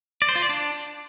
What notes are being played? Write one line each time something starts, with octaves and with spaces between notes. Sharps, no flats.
D5
C5
F4
D5
D4